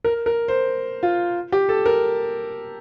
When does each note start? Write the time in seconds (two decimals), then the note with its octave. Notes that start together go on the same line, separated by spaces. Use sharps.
0.04 A#4
0.26 A#4
0.48 C5
1.03 F4
1.52 G4
1.69 A4
1.86 A#4